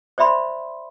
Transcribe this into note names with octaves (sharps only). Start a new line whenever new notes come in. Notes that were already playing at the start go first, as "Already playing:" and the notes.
C5 D5 E5 B5 C6